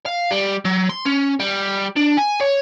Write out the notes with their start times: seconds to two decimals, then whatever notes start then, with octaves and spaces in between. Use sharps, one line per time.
0.06 F5
0.31 G3
0.65 F#3
0.90 C6
1.06 C#4
1.40 G3
1.96 D4
2.17 G#5
2.40 C#5